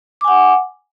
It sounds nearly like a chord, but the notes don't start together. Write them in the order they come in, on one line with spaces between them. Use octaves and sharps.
D6 G#5 F#5